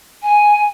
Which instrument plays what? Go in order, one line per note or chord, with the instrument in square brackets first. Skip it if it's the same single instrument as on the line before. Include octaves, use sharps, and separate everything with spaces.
[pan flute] G#5